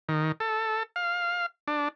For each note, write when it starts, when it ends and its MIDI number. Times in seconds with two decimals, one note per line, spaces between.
0.09 0.32 51
0.40 0.83 69
0.96 1.46 77
1.68 1.88 62